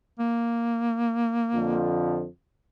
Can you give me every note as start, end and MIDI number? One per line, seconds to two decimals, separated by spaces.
0.19 1.90 58
1.55 2.26 41
1.55 2.26 50
1.55 2.26 53